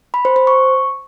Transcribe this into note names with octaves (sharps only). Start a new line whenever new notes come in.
B5
C5
C5
C#6